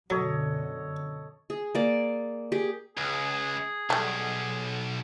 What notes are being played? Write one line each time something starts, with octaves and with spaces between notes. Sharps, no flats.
F#2 B2 D3 F#3 A4 C#5 D#5
G#4
A#3 D5
G4 G#4
C#2 G#4
B1 G3 A3